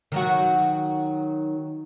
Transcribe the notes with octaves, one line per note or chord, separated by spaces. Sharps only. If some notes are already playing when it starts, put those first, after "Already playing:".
D#3 F#3 F#4